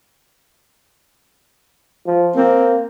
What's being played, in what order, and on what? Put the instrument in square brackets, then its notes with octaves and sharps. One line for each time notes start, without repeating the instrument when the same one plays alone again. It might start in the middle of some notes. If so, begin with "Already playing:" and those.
[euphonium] F3
[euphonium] A#3 [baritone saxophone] C4